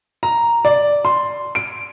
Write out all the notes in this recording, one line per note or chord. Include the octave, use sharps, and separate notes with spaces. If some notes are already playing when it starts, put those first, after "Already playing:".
A#5
D5
C6
D7